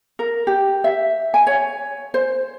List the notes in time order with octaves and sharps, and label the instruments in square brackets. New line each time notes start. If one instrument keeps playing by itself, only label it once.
[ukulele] A#4
G4
E5
G#5
C#5
C5